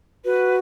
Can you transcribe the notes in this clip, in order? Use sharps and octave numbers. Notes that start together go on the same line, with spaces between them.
F#4 B4